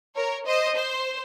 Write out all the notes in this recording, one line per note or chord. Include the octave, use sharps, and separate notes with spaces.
A#4 C#5
C5 D#5
C5